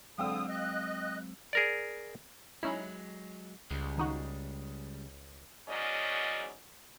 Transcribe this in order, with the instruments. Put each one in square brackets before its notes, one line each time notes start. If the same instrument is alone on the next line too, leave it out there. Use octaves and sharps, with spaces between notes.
[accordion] D3 D#6 [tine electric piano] F#3 G#3 C4 [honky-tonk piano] F5 G5 E6
[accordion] D#5 [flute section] F#6
[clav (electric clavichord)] G#4 A#4 D5
[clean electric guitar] F#3 G#3 [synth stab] C#4 D#4 E4
[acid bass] C#2 [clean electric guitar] C#3 G3 G#3
[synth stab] D#3 D#4 F#4
[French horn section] E2 G#2 F#3 C#4 D5 D#5